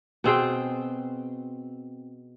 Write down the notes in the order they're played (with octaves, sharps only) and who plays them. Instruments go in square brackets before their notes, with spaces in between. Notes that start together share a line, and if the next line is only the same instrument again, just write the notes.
[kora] B2 C4 G#4 G5